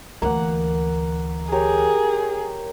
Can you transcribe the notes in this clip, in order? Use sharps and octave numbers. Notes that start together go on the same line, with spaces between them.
D2 E3 A#3 F#5
G4 G#4 A#4 C#5